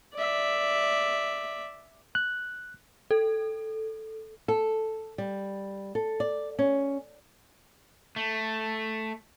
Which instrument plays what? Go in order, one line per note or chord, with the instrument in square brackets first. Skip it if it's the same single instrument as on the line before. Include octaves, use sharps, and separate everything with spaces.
[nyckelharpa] D5 E5
[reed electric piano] F#6
[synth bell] A4
[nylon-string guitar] A4
G3
A4
D5
C#4
[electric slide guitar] A3